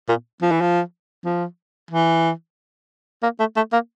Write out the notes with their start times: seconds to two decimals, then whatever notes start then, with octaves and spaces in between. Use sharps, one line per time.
0.09 A#2
0.42 F3
0.51 E3
0.61 F3
1.25 F3
1.91 E3
3.23 A#3
3.39 A3
3.56 A3
3.73 A#3